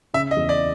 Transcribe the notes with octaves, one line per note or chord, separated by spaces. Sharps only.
C#3 E5
D#5
E2
D5